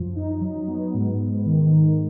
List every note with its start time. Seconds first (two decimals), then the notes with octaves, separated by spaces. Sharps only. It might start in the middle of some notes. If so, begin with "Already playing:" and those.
Already playing: F#2 F3
0.16 D#4
0.41 F#3
0.68 B3
0.94 G#2
1.20 G#2
1.46 D#3
1.73 D#3